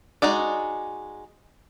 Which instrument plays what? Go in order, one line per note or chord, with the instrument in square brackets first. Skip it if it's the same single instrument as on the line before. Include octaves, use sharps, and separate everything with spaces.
[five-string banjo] G#3 D#4 F#4 D5